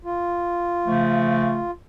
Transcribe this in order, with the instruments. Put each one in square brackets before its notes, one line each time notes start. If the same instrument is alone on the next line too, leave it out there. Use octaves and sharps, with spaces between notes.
[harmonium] F4
[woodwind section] C#3 F3 A3